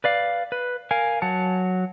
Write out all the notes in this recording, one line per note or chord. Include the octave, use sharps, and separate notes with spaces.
B4 D5 F5
B4
A#4 F5 G#5
F#3 F#5 A5